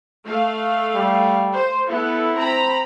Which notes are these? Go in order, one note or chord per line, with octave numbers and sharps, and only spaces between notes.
A3 F5
G3
C5
B3 E4 A4
C4 A#5 B5